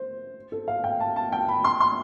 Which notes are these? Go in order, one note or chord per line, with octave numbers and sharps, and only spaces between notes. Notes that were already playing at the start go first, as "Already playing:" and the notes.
Already playing: C5
A4
F5
G5
A5
A5
G5
B5
C6
C6